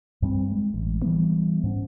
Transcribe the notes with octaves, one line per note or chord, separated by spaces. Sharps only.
G2 G3 C4
G#3
A1
E3 G3 B3
G#2 C#4